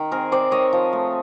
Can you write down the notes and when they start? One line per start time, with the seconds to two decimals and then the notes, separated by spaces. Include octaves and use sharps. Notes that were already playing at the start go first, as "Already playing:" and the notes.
Already playing: D#3
0.11 C4 G#4 A#4
0.32 C4 C5 D5
0.51 D#3 C#5 D#5
0.73 F3
0.93 A3